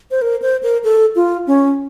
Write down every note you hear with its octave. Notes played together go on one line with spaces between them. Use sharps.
C5
A#4
C5
A#4
A4
F4
C#4